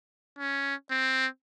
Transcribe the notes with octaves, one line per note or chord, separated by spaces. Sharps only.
C#4
C4